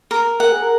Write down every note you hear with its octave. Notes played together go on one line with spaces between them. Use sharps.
A#4
A#4 F#5
G#4
A#4